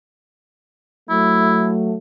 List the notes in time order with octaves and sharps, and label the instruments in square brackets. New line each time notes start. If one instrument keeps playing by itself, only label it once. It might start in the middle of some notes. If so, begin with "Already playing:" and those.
[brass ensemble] F#3 A3 [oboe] E4